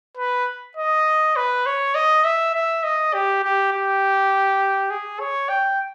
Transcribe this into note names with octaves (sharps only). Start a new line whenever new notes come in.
B4
D#5
B4
C#5
D#5
E5
E5
D#5
G4
G4
G4
G#4
C#5
G5